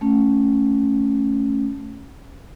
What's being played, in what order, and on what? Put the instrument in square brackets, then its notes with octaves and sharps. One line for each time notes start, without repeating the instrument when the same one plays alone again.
[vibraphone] A3 C#4